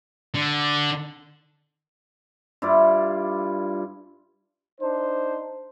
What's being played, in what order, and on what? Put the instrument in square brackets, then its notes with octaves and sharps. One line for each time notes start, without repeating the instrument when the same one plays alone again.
[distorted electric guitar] D3
[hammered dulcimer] G2 E4 F4 D5
[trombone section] D4 D#4 C5